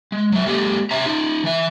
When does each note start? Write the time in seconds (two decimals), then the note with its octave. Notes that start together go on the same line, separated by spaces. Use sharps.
0.12 G#3
0.32 F#3 C5 E5
0.46 G#3 A#3 G4 A4
0.91 C3 C#5 E5 A#5
1.06 D#4 F4
1.44 E3 E5